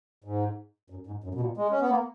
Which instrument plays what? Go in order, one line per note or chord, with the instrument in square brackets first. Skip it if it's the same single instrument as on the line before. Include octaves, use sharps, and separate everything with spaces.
[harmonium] G#2
F#2
G#2
F#2
B2
A#2
G#3
C#4
B3
A#3